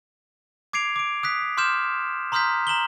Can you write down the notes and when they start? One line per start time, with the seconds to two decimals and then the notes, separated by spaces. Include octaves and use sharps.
0.73 D6 G#6 C7 D7 F7
0.96 D6 D7
1.23 D#6 F#6 B6
1.57 C6 D6 F6 G6 E7
2.32 A#5 C6 D#6 F6 G6 B6
2.67 A#5 E7 F#7 G7